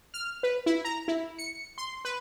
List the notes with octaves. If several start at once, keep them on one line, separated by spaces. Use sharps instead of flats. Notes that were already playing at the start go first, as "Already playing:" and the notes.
F6
B4
E4
A#5
E4
C#7
C6
B4